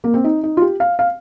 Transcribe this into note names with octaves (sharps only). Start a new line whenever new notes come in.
A#3
C4
D#4
D#4
F4
G4
F5
F5